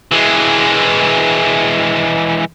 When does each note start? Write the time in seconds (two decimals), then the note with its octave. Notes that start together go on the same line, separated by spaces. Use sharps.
0.11 E3 G#3